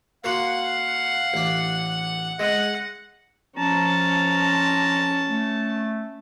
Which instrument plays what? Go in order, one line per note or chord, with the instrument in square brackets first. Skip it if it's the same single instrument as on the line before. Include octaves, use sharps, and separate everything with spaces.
[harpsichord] A#3 F#4 C6 [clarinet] F5 [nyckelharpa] F#5
[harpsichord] A1 D4
[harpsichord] G#3 [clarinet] D#5 [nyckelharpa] F#5
[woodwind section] F3 A#5 [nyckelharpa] C#4 A5
[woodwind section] A3